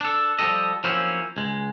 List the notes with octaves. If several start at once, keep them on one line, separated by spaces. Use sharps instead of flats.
D4 A4
F3 G3 G4 A4 D#5
F3 F#3 A#3 C4 C#4 E4
C#2 G#3